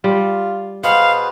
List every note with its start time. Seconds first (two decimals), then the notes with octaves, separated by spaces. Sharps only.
0.04 G3 F4
0.83 B2 G#4 B4 C5 F5 F#5